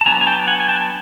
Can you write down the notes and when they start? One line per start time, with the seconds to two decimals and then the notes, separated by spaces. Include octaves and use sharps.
0.01 A5
0.06 F#3 B3 D4 G#5 A#5
0.21 G#5
0.27 G5 A5
0.47 F#5 G#5
0.60 G#5
0.68 G5 A5